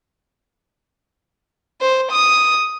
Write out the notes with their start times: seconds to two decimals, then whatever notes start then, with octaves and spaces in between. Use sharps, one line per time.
1.81 C5
2.12 D#6